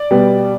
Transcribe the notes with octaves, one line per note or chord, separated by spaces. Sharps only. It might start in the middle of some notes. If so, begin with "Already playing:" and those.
Already playing: D5
B2 G3 B3